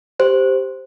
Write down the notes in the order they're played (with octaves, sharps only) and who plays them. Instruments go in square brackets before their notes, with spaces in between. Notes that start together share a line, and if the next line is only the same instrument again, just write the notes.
[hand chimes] G4 C5